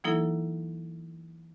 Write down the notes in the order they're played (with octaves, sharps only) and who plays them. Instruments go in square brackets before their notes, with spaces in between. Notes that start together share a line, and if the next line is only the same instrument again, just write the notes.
[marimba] E3 F#3 A#3 D#4 E4 A4